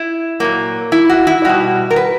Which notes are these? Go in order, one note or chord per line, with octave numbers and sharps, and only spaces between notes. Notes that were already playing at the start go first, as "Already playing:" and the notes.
Already playing: E4
A#2 F#3 A#3
E4
F#4
E4
B2 G3 F#4
A#4
B4